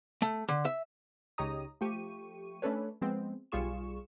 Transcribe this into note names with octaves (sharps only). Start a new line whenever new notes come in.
A3
D3
E5
C#2 D#4 G4 C#5 A#5 D#6
F3 A3 G4 C#6 D#7
A3 C#4 D4 A4 B4 C#5
F3 G#3 B3 C4
B1 G3 F4 G#4 C#6 E7